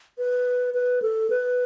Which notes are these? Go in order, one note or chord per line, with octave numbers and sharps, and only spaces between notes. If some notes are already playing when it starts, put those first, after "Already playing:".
B4
B4
A4
B4